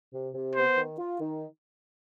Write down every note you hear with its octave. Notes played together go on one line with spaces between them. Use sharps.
C3
C3
B3 C5
D#3
F4
D#3